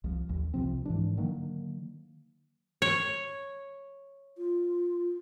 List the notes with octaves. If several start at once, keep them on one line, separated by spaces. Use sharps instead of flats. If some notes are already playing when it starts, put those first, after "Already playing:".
C2 F3
A1 D#2
C2 C3 F3 C4
G#2 E3 D4
D3 D#3 F#3 A#3
C#5
F4